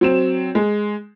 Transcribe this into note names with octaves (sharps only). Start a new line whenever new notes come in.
F#3 C4 E7
G#3